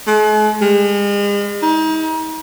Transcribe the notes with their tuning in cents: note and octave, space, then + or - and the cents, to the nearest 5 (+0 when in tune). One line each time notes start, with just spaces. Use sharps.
G#3 +45
G#3 -40
D#4 +35